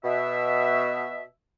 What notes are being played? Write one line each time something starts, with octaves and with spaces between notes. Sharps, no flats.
B2 E5